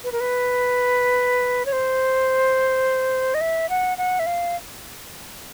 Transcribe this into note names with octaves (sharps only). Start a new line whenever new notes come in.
B4
A#4
B4
C#5
C5
D#5
E5
F#5
F#5
E5
F5